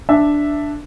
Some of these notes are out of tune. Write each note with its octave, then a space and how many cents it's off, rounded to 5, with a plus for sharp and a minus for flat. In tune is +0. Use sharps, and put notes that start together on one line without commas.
D4 +0 E5 +0